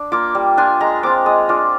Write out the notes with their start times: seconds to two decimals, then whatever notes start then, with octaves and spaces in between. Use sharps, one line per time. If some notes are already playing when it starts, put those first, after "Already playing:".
Already playing: D4
0.12 A#3 F4 D6
0.35 G3
0.57 D4 F4 G#5
0.80 G#3 A#5
1.03 C4 F4 D6
1.26 G#3 D#6
1.49 D4 F4 D6